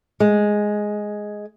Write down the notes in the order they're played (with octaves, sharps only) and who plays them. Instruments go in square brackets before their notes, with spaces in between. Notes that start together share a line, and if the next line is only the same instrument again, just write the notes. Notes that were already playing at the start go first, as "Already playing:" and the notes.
[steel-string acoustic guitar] G#3